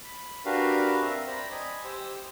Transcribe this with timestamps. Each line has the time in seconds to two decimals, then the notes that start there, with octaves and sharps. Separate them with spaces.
0.04 B5
0.45 D4 F#4 G4 A#4 B4 F5
1.02 C4 E5 A#5
1.27 C5 D5 G5 A#5 B5
1.51 D#5 G#5 B5
1.84 G4 C5 G5 E6